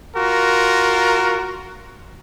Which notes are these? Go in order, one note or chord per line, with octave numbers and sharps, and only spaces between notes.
F4 F#4 A#4